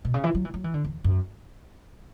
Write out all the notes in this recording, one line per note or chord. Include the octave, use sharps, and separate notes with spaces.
B2
C#3
E3
F#3
E3
F#3
E3
D3
E2
F#2